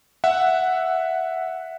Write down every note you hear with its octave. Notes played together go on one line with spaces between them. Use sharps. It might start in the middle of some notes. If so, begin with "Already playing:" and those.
E5 F#5